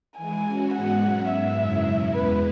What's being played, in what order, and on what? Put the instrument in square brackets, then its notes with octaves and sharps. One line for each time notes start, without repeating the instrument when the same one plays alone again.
[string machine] E3 G#3 E4 [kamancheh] G#5
[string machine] E3 C#4 F#4
[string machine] G#2 G#3 B3 F#4 [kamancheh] F#5
[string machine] B2 F#3 C#4
[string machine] G#2 G#3 B3 [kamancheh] E5
[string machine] F#2 C#3 G#3 E4
B2 F#3 C#4 E4
[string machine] E2 B2 G#3 B3 E4 [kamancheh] B4